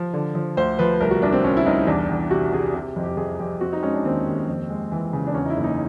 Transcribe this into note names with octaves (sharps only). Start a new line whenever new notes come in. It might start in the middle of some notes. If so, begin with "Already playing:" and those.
Already playing: F3
D3
F3
D2 C5
F3 B4
C2 A#4
F#4
C2 D4
C4
C2 C#4
E4
C2 D#4
E2 D4
E2
C3 F#4
C3 G#4
C3
F2
G4
F2 G#4
F2 G4
C4 F#4
D#4
G#3 C#4
D4
D#2 C4
D#2
F2
G#3
E3
C#3
D4
E2 C#4
D#4
E4
F#1
D#4